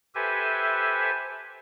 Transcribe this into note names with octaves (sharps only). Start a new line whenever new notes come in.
G4 A4 B4 C5 E5 G#5